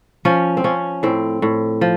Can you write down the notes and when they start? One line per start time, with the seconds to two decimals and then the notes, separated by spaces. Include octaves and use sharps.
0.25 F3 C#4
0.57 C4
0.64 F3 C#4
1.03 A2 C4
1.42 A2
1.81 F3